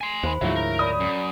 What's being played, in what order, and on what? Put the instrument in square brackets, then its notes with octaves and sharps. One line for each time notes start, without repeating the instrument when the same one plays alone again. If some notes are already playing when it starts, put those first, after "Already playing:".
[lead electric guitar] G#5 C6
[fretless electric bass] D#2 [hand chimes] C5 B5
[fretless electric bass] D2 G#2 F3 [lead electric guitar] F#3 [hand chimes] E4 C#5 E5
[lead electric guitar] A#4
[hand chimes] C#5 D5 B5 [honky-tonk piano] D#6
[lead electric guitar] F#2